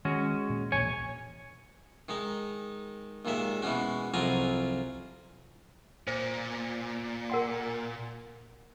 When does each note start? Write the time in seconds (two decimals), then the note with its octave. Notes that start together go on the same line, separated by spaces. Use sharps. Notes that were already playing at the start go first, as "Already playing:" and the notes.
0.05 D#3 G#3 C#4 F#4
0.50 A#2
0.72 E1 A#1 A#3 C#5 G#5
2.09 D#3 G#3 D#4
3.25 D#2 A#2 D#3 G#3 E5
3.62 B2 E3 G#3 C#4 F#4
4.14 C2 F2 F#3 F4 G#5 A#5
6.07 A#2 C5
7.30 A#4 F#5 C6